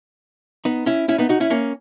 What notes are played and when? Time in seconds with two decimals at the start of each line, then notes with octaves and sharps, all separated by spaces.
0.65 B3 D#4
0.86 C#4 E4
1.08 C#4 E4
1.18 B3 D#4
1.29 D#4 F#4
1.40 C#4 E4
1.50 A#3 C#4